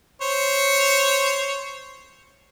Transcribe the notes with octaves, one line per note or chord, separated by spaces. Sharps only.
C5 C#5